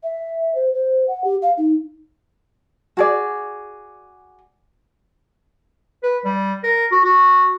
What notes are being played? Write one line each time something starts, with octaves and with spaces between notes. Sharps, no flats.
E5
C5
C5
F#5
G4
F5
D#4
F#4 G#4 D5
B4
G3
A#4
F#4
F#4